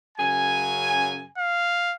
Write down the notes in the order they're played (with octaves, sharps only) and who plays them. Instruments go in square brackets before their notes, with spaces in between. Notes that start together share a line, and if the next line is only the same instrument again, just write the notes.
[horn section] F#2 C#3 G#5
[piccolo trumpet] F5